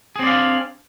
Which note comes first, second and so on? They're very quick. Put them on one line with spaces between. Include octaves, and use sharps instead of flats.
G#4 C4 D5 F5 D4